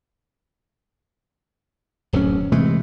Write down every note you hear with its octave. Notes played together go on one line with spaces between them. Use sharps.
D1 F#2 F#3 C#4
C3 E3 G#3 A3